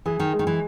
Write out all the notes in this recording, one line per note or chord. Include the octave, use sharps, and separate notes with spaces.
E3 G#4
D#3
G#3
D#3
E3